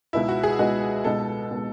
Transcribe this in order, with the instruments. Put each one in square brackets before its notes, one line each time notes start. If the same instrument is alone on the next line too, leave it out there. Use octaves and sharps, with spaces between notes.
[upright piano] C#2 B2 G#3 B3 D#4 [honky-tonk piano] E4
[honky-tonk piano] F#4
G#4
[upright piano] C#2 B2 G#3 B3 D#4 [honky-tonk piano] F#4
[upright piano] C#2 B2 G#3 B3 D#4 [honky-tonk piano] A4
[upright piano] B2 G#3 B3 D#4